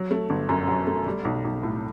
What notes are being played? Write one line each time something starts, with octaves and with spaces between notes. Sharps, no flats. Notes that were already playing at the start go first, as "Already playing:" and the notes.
Already playing: F#3
A3
G1
F#2
F#3
A3
G3
B1
B1
A2